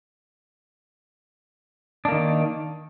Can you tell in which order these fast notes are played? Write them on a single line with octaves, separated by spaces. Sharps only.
D4 A#3 D#3